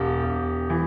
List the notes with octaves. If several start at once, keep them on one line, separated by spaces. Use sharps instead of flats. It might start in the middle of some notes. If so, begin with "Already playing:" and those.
Already playing: E1 G4
E1
E3